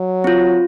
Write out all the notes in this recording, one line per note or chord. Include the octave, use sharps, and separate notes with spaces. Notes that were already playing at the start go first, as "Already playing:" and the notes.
Already playing: F#3
C4 F4